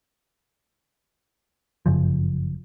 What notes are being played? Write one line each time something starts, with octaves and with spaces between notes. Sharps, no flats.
G1 F#2 C#3 F3